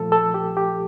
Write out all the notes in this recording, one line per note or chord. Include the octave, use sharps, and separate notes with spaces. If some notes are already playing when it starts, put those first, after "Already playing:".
Already playing: A#2 F3 A3 A4
A4
G4
G4